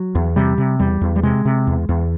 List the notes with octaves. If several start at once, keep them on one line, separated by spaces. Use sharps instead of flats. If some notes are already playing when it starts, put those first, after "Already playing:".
Already playing: F#3
E2
C3 G3
C3
E2 G3
E2
G3
C3 G#3
C3
E2
E2